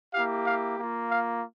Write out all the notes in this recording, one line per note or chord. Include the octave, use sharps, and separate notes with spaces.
A#3 E4 G4 F5
F5
A#3 F4
F5